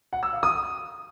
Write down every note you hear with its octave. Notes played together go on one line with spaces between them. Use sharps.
F#5
E6
F5
D#6